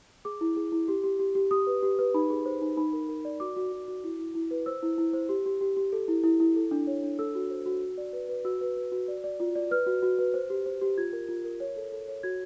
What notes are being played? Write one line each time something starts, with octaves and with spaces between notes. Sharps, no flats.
G#4 D6
E4
G#4
E4
G4
G4
G4
G4
G4 D#6
B4
G4
B4
D#4 B5
G#4
C5
D#4
D#4 B5
A#4
A#4
D5
F#4 D6
F#4
F#4
F#4
E4
E4
E4
B4
C5 E6
E4
E4
C5
G4
G4
G4
G4
A4
E4
E4
E4
A4
D4
C#5
D4
A4 E6
F#4
C5
F#4
F#4
D5
B4
B4
F#4 E6
B4
B4
F#4
D5
D5
F4
D5
B4 F6
F#4
F#4
B4
C5
G4
C5
G4
F4 G#6
A#4
F4
A#4
C#5
A4
A4
C#5
F#4 G#6